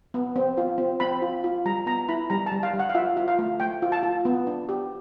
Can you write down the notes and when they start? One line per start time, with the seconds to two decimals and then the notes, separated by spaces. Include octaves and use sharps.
0.14 B3
0.36 C4
0.57 F4
0.78 C4
1.00 C4 B5
1.22 F4
1.44 F4
1.65 G3 A#5
1.86 B3 A#5
2.09 E4 B5
2.30 G3 A#5
2.46 A5
2.52 G3
2.63 F5
2.74 G3
2.79 F#5
2.90 F5
2.95 F4 E5
3.17 F4
3.28 F5
3.39 A3
3.60 A3 G5
3.82 F4
3.92 A5
4.03 F4
4.25 B3
4.47 D4
4.69 G4